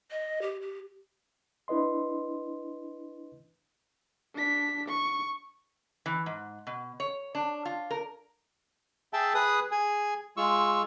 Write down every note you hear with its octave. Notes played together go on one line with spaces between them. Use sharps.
D#5
G4
G4
D4 E4 B4 D#5 C6
D4 B6
C#6
E3
G#2
B2
C#5
D4
F4
A#4
G#4 E5 G5 A5
G#4 B4 D#6
G#4 G#5
G#3 F4 C#6 E6